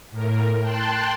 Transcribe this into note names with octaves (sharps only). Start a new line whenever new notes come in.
A2 A#4
G5 A5 C6 F#6 A6